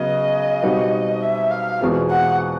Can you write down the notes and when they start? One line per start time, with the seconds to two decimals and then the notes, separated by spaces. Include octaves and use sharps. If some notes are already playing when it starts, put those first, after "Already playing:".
Already playing: C#3 F#3 B3 D#5
0.63 B2 G3 C4 D#4 F#4
1.22 E5
1.51 F5
1.80 E2 B2 G#3 C4 F4
2.10 F#5